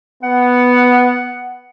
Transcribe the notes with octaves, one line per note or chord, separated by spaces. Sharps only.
B3 F#5